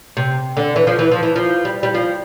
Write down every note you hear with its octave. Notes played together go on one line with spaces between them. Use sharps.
C3
D3
E3
F3
E3
F3
E3
F3
G3
G3
F3